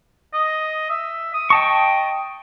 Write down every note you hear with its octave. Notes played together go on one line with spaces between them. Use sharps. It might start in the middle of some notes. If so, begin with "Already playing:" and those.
D#5
E5
D#6
D#5 G5 A5 C#6